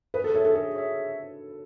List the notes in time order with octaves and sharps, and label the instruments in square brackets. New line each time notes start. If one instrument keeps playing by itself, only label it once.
[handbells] G#4 [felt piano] B4
[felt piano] A4
[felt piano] A4 [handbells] C#5 E5
[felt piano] A4
[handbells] G#4 [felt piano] A4
[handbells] C#5 E5